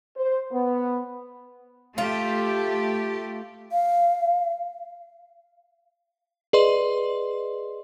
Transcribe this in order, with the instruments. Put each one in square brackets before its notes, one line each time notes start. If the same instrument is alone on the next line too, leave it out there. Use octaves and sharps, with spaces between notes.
[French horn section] C5
B3
[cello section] A3 G4 [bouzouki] F4
[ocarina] F5
[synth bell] G#4 B4 D5 D#5 C6